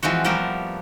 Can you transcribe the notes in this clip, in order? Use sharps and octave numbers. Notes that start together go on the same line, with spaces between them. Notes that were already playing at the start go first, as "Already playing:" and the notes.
E3 F3 G#3 C4 F#4
F3 G3 A3 B3 G4 A#4